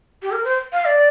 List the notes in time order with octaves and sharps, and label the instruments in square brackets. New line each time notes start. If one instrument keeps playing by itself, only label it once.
[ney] G4
A#4
C5
F5
D5